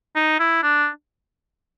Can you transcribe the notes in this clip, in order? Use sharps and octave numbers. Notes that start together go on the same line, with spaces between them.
D#4
E4
D4